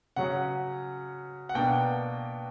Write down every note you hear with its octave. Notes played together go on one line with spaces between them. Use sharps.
C#3 F#3 C#4 F#5
F#5
B2 A#3 D4 G5